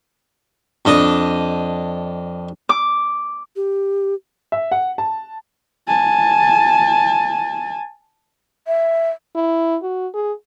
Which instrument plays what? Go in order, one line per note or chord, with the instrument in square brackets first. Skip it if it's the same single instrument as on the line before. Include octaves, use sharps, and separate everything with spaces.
[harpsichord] F2 D4 D#5 D#6
[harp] D6
[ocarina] G4
[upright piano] E5
F#5
A5
[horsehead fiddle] G#5 A5
[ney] E5
[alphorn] E4
F#4
G#4